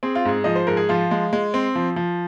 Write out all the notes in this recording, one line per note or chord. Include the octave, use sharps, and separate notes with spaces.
C4 G#4
F4
G#2 G#4
F3 D#5
C5
G#2 A#4
G#4
F3 F4
G#3
G#3
C4
F3
F3